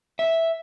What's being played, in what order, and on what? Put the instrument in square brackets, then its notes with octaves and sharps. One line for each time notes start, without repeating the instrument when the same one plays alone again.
[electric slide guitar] E5